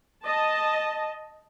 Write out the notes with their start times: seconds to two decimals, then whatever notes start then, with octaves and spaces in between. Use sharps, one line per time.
0.24 D#5 A5